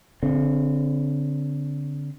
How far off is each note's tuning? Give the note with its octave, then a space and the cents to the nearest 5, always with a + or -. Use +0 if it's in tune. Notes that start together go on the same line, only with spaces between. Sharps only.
D3 -25 C4 -10